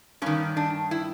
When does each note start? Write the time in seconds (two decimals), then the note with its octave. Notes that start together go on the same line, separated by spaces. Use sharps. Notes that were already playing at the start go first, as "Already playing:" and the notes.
0.22 G2 D#3 C#4
0.57 D4
0.91 E4